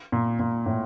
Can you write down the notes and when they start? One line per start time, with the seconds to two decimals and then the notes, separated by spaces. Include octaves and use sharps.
0.12 A#2
0.39 A#2
0.66 A2